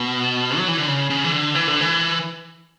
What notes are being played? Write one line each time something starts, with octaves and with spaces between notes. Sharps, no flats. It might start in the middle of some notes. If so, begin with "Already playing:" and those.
Already playing: B2
F#3
E3
D3
C#3
C#3
E3
D3
E3
D3
E3